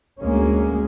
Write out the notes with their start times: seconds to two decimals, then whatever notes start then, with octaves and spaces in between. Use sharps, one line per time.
0.20 D2 G#3 A#3 C#4